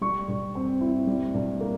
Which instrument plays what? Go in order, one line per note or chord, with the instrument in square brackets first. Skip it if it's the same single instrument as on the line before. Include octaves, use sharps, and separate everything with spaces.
[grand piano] G3 C#6
G2
C4
E4
G3
G2
A#3